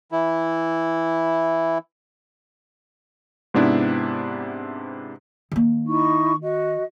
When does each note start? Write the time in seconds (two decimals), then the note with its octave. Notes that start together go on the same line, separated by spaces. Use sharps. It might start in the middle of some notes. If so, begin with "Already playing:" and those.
0.12 E3 E4
3.54 G#2 C3 B3 D4 E4
5.52 D#3 A#3
5.85 D#4 E4 C#6
6.41 F#4 D#5